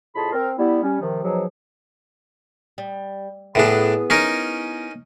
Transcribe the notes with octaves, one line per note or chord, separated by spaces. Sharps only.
F2 A2 G#4 A5 B5 C6
C4 A#4
G3 B3 E4
G3 C#4
C3 D#3 F3
G#2 B2 F3 F#3
G3
A2 B3 D4 E4 G#4
C#4 D#4 A#4